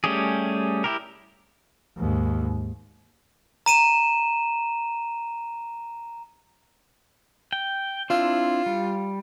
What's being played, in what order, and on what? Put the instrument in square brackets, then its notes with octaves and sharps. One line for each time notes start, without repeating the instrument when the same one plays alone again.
[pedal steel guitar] G3 A3 C#4 G4 G#4
E4 G4 A#4
[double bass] D#2 G#2
[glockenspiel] A#5 D#7 E7
[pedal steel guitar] G5
[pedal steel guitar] C4 D4 E4 [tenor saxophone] F4
[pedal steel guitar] G3